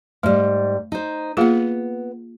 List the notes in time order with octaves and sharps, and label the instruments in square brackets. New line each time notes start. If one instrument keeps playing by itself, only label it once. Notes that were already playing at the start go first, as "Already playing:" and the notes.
[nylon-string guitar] G#2 G3 [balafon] A3
[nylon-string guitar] D#4 C5
[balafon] A#3 F4 G#4 [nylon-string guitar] B3 F#5